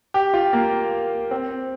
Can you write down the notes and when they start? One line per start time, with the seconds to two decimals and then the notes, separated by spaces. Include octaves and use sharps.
0.14 G4
0.34 F4
0.53 A#3
1.31 C4